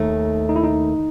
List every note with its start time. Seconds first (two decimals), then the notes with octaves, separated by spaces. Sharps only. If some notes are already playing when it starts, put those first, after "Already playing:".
Already playing: D#2 D#3 A3 D#4
0.49 D#4
0.56 E4
0.63 D#4